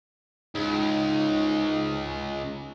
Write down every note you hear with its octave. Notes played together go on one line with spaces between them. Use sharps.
C#2 G#2